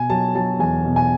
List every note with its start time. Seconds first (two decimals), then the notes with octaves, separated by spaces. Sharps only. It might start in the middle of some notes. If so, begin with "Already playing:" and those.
Already playing: B2 G#5
0.10 F#3 A5
0.35 F#3 A5
0.59 E2 G#5
0.85 B2
0.96 G#5